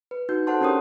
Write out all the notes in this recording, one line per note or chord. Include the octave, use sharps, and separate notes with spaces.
B4
D#4 F#4 G6
A4 C5 F#5 A5 C6
C#4 D4 G4 A#4 C#5 D#6